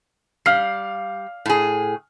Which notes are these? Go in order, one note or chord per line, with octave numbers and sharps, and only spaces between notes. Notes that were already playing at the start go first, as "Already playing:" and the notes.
G3 F5 F6 C7
A2 G#4